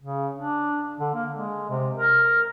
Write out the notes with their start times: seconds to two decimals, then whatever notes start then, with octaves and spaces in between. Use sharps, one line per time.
0.01 C#3
0.35 D4
1.00 D3
1.14 A#3
1.31 G#3
1.69 C3
1.97 A#4